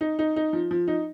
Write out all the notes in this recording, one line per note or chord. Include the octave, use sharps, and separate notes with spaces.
D#4
D#4
D#4
F3
F3
D#4